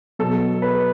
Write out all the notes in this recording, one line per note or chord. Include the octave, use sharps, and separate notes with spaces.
B2 F#3 A4
B4